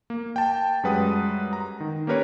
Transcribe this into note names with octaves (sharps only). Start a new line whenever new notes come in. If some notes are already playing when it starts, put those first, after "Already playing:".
A#3
G5 A5
F#2 G3 G#3 B4 F#5 D#6
A#5
D#3
A#3 C#4 G4 A#4 B4 C#5